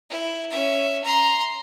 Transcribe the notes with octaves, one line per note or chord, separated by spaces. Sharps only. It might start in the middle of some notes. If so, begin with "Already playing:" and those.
E4
C#4 E5
A#5 C6